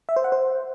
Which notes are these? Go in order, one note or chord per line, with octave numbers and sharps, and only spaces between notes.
E5
C5
F#5
C5